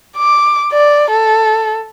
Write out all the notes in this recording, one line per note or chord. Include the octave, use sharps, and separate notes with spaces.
D6
D5
A4